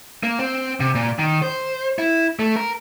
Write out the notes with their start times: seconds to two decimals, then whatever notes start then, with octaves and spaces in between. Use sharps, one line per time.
0.23 A#3
0.39 C4
0.80 C3
0.95 A#2
1.19 D#3
1.42 C5
1.99 E4
2.39 A3
2.56 A#4